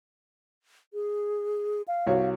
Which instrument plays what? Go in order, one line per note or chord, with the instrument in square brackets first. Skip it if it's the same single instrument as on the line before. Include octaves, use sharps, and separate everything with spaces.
[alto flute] G#4
F5
[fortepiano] C2 F#4 C#5